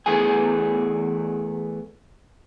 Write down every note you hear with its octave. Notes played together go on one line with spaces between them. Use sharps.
E2 E3 A3 G#4 G#5